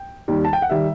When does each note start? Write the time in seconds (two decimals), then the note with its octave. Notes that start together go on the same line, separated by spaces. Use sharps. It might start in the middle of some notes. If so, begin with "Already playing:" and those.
Already playing: G5
0.28 D#2 D#3 G3
0.45 A5
0.53 G5
0.62 F#5
0.69 D#3 G3 E5